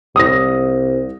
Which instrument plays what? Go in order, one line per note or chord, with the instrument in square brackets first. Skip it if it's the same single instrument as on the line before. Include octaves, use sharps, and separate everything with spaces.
[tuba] C2 [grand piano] D#6 A#6